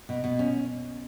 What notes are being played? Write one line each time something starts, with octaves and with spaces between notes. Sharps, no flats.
B2
B2
C#4